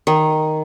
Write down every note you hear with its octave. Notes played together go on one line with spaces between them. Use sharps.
D#3